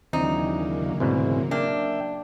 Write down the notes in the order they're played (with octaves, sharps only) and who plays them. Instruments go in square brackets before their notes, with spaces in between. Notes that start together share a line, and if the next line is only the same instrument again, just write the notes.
[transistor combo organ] D#2 E3 D4 [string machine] C#3 F#3 A#3 [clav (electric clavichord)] C4 [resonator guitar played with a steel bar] D#4
[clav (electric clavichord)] D2 G#2 B2 [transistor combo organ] E3 C4
[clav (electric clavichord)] A#3 [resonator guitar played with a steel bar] D4 [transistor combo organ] E5 G5